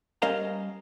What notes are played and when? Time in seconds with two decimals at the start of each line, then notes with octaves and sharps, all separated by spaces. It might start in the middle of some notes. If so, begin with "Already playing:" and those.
0.22 G3 C#4 A#4 D#5 F5 A#5